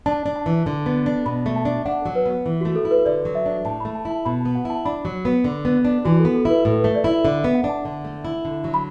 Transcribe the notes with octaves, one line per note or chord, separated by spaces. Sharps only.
D4 A5
D4
A5
E3
D3 A5
B3
D4
B2 B5
A3
A5
D4
D4 F#5
F#3
B4
B3
E3
A3 F#4
A4
E4
B4
D3 D5
F#3
E5
D4
A2 A5
A3 B5
A5
E4 A5
B2 B5
B3 A5
F#5
E4 A5
D4 B5
F#3
B3
D3
B3
D4
E3 F#4
A4
B3
A4
E4 B4
A2 A4
A3 B4
D5
E4
E5
D3 E5
B3 E5
F#5
D4
A5
D3
A3
E4
D3
F#3
B5